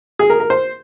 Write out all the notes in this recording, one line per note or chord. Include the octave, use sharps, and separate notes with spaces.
G#4
A#4
A#4
C5